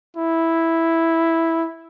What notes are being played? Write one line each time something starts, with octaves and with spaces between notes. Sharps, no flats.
E4